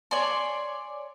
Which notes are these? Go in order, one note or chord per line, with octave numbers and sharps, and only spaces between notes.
C#5 D5 G#5 C6